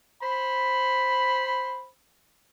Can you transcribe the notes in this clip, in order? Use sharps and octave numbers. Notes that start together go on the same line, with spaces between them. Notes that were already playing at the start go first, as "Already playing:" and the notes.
C5 B5